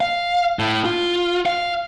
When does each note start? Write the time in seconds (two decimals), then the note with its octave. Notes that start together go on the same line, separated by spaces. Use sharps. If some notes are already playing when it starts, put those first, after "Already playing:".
0.01 F5
0.59 A2
0.85 F4
1.46 F5